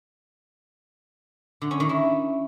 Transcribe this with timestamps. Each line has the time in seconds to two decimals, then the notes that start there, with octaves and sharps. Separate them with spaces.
1.62 D3
1.71 C#4
1.80 D#3
1.89 E4